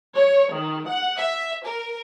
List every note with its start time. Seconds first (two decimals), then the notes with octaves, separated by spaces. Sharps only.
0.15 C#5
0.53 D#3
0.87 F#5
1.19 E5
1.64 A#4